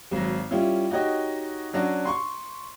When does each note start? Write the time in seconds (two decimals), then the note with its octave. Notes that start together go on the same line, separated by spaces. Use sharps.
0.11 G#1 F#3
0.51 G3 C#4 E4 F4
0.90 D#4 F#4 G4 C#5 D#5
1.73 F#3 C#4 D4 F#4
2.05 C6 C#6